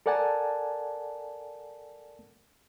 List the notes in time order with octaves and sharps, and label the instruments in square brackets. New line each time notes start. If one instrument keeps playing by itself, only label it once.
[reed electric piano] A4 A#4 D5 F#5 G#5 A5